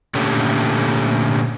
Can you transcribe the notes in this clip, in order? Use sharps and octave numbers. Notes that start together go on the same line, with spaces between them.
A#2 D3 A3 C#4 G4